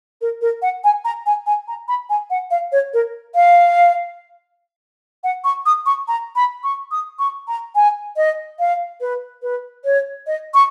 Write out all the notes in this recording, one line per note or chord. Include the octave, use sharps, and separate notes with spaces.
A#4
A#4
F#5
G#5
A#5
G#5
G#5
A#5
B5
G#5
F#5
F5
C#5
A#4
F5
F#5
C#6
D#6
C#6
A#5
B5
C#6
D#6
C#6
A#5
G#5
D#5
F5
B4
B4
C#5
D#5
C#6